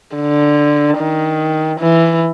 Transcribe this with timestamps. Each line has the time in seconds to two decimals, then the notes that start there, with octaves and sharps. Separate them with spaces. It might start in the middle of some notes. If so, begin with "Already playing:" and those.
0.16 D3
0.98 D#3
1.81 E3